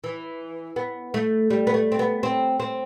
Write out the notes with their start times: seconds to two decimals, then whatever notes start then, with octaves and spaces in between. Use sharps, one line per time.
0.04 E3
0.76 B3
1.14 A3
1.50 G3
1.67 B3
1.74 A3
1.92 C4
1.99 B3
2.23 C4
2.60 C4